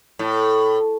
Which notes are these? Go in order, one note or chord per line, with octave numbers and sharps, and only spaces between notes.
A2